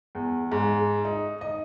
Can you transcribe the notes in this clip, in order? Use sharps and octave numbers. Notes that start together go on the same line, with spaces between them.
E2
G#2
D#4
D#5